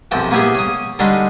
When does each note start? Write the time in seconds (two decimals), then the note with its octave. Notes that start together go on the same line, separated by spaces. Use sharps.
0.11 B1 F#2 C3 F3 G5
0.31 A#3 B3 C#4 E4 G4 G#4
0.55 C#4 D#6
0.99 D3 G3 G#3 C#4 D#4